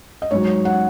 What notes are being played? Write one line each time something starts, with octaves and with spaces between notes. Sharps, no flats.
D#5
G#2 F#3 C#5
F#5